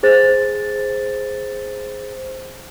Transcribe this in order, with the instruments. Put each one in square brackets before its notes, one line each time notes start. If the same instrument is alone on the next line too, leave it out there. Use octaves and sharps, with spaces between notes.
[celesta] G#4 C5 A6